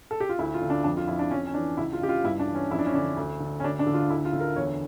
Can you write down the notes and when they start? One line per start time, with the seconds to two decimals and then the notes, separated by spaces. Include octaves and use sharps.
0.11 A4
0.20 G4
0.29 F4
0.39 D2 E4
0.54 F4
0.62 D3
0.70 D4
0.84 F2 D4
0.97 F4
1.08 F2 E4
1.19 D4
1.31 F2 C#4
1.47 C#4
1.54 E3 D4
1.77 C#2 E4
1.93 F4
2.01 C#2 G4
2.09 F4
2.24 G2 E4
2.39 D4
2.47 E3
2.55 C#4
2.70 F2 E4
2.79 D4
2.86 C#4
2.94 D3 D4
3.16 D2
3.40 D3
3.60 C#4
3.64 D2 D4
3.79 D4
3.87 D3
3.94 F4
4.10 D2 E4
4.25 F4
4.33 D3
4.41 A#4
4.56 E2 C#5